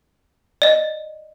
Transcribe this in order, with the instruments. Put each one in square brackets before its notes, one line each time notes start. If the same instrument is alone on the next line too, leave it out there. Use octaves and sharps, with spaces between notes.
[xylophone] D5 D#5